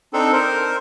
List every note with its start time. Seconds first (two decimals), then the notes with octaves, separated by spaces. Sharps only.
0.13 C4 D4 D#4 A4
0.33 A#4 C5